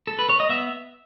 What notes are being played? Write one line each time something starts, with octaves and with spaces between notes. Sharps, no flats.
A4
B4
C#5
D#5
B3 E5